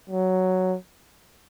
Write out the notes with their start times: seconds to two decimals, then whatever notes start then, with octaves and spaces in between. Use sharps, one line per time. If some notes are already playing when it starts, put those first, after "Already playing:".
0.09 F#3